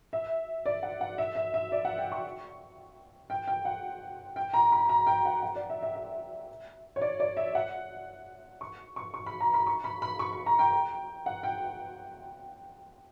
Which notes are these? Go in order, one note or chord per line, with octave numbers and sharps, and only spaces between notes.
E5
D5
F#5
F#5
E5
E5
E5
D5
F#5
G5
C#6
G5
G5
F#5
G5
A#5
B5
A#5
G5
F#5
F#5
D5
E5
E5
E5
C#5
D5
D5
E5
F#5
C#6
C#6
C#6
B5
A#5
B5
C#6
B5
B5
C#6
B5
A#5
G5
F#5
G5